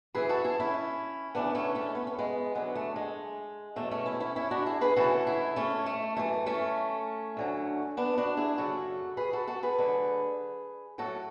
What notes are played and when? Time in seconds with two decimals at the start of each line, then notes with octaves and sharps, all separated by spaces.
0.14 F#2 E3 G#4 B4
0.29 F#4 A4
0.44 E4 G#4
0.60 C#4 E4
1.35 D2 C#3 E3 B3 D4
1.55 A3 C#4
1.75 A3 C#4
1.95 B3
2.07 C#4
2.18 G#3 B3
2.55 F#2 D3 F#3 G#3 B3
2.75 A3
2.96 G#3
3.76 E2 B2 F#3 A3
3.91 A3 C#4
4.06 C#4 E4
4.20 C#4 E4
4.36 C#4 E4
4.51 D4 F#4
4.66 E4 G#4
4.81 G#4 B4
4.96 D2 C#3 E3 F#4 A4
5.27 E4 G#4
5.56 A3 C#4
5.86 A3
6.17 F#2 E3 A3
6.46 A3 C#4
7.37 D2 D3 F#3
7.97 B3 D4
8.18 D4 F#4
8.37 E4 G#4
8.58 F#2 C#3 F#3 F#4 A4
9.17 G#4 B4
9.33 F#4 A4
9.47 F#4 A4
9.63 G#4 B4
9.78 D2 D3 F#3
10.98 A2 F#3 F#4 A4